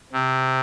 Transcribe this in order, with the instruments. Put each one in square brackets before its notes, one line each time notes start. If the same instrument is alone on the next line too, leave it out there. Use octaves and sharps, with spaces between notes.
[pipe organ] C3